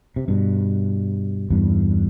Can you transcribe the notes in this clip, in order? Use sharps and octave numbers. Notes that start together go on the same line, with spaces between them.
C3
G2 B2
E2 G2